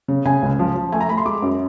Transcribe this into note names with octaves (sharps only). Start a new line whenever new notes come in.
C#3
C#3 G#5
C#2
F3
F3
A3 G#5
A#5
A3 B5
C6
G#3 D6
F#2